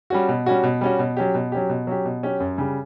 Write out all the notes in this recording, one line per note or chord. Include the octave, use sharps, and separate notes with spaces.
G3 C#4 F#4
B2
G3 C#4 F#4
B2
G3 C#4 F#4
B2
F#3 C#4 G4
B2
F#3 C#4 G4
B2
F#3 C#4 G4
B2
F#3 C#4 G4
F#2
C#3 G3